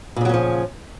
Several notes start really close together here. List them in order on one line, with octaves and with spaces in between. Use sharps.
A#2 C#3 F#3 C#4 F3